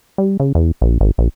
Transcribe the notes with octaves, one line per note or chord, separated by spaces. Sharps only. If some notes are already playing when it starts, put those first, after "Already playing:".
G3
C#3
E2
A#1
G#1
A#1